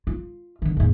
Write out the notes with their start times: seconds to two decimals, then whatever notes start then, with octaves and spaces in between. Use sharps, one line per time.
0.07 F4
0.62 D3 D#3
0.77 E2 A2